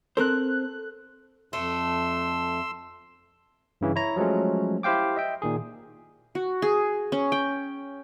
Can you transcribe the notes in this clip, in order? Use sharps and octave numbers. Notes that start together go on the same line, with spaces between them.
C4 A4 A#4 C5 F#6
F2 A3 C6 E6
G2 C#3 E3
E4 C#5 A#5
F3 F#3 G#3 A3 C#4
E4 G4 C5 F5 G5 D6
D#5 E5 G5
A#2 D#3 G#4
F#4
G#4
C#4
G5